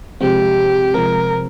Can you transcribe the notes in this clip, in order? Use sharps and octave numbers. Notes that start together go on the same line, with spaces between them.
C3 F3 G#3 C4 G4
C3 F3 G#3 C4 A#4